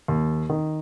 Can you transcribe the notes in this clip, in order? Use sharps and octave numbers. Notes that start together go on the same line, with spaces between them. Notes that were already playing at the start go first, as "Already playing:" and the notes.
D#2
D#3